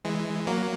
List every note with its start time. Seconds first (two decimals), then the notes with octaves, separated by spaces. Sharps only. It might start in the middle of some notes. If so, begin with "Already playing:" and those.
0.04 E3 G#3
0.47 F#3 A#3